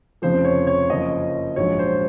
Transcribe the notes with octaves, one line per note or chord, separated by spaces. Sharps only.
F1 F2 C#3 F3 C5
C#5
C#5
F#1 F#2 F3 D#5
A#1 G#2 F#3 C#5
C5